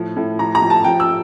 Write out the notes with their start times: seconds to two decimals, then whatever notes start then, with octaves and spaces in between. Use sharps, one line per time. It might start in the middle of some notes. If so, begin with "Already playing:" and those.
Already playing: A2 F3
0.16 A2
0.39 F3 A#5
0.55 A#5
0.62 F3
0.70 A5
0.84 F3 G5
1.00 E6